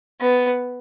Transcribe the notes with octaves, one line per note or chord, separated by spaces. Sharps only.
B3